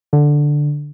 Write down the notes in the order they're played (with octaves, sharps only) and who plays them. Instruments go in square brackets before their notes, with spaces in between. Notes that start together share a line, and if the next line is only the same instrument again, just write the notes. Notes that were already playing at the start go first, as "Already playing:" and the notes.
[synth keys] D3